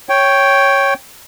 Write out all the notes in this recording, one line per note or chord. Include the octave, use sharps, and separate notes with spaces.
C#5 G5